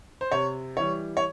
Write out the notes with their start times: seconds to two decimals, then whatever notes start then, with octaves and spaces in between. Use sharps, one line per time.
0.21 C5
0.32 C3 C#5
0.77 E3 G3 C#5
1.17 C#5